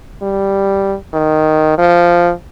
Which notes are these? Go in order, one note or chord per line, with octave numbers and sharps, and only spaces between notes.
G3
D#3
F3